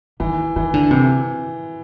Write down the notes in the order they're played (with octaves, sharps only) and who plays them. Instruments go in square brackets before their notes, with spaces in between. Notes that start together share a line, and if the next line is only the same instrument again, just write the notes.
[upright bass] D#3 [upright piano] E3
[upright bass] D#3 [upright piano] E3
[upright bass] D3
[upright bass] C3 [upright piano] E3